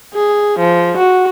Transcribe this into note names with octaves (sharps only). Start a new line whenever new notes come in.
G#4
F3
F#4